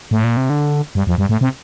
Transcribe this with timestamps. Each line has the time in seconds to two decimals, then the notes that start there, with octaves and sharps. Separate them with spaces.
0.11 A2
0.24 A#2
0.37 C3
0.50 D3
0.95 G2
1.07 F2
1.18 G2
1.29 A2
1.41 C3